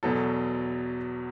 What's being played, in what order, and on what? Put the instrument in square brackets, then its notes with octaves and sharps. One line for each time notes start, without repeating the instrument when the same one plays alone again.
[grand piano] E2 B2 F#3 A4